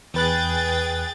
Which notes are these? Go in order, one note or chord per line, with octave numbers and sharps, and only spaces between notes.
E2 G#4 B4 G5 F#6 A6